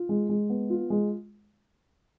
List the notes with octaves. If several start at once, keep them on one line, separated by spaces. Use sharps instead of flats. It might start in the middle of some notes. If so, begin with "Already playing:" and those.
Already playing: F4
G#3
G#3
B3
F4
G#3